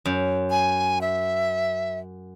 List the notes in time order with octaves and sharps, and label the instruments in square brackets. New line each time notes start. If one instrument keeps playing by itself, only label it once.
[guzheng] F#2
[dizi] G#5
E5